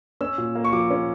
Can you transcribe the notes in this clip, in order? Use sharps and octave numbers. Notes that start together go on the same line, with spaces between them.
C#4 E6
A#2
A#3
C#6
F3 D6
C#4